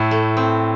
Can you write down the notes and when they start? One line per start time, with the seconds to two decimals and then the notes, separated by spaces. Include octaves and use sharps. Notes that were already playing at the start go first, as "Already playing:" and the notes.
Already playing: A2 E4
0.11 A3
0.37 C4